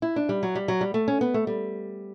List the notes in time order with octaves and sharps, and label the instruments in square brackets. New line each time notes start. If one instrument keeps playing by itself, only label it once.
[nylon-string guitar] E4
D4
G3
F#3
G3
F#3
G3
A3
C#4
B3
A3
G3